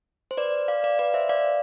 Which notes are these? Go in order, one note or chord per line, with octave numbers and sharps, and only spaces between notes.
C5
B4 D5
D5 F5
D5 F5
B4 D5
C5 E5
D5 F5